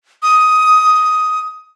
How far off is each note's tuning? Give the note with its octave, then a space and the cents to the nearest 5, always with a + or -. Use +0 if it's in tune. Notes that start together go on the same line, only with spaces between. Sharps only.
D#6 +10